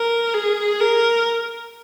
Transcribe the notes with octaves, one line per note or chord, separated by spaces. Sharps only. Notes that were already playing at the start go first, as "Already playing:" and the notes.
Already playing: A#4
G#4
A#4